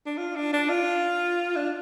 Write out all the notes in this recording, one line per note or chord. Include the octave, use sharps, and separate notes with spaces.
D4
F4
D4
D4
F4
D4